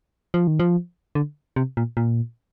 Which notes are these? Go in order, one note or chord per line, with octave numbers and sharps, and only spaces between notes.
F3
D#3
F3
D3
C3
A#2
A#2